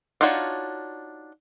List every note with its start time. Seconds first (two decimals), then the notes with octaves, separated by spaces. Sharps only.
0.21 D4 D#4 F4 F#4 C#5